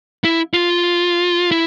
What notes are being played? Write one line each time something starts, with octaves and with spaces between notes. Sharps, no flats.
E4
F4
E4